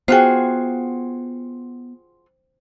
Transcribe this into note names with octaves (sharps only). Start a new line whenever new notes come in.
B3 F4 F#4 G#4 C5 G5